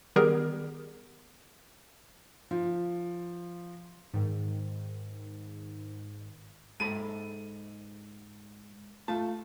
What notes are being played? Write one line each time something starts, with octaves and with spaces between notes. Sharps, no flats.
D#3 G3 B3 G4 G#4 A#4
F3
G#2 D#3
G#2 A4 B5 D#7
A3 F4 A5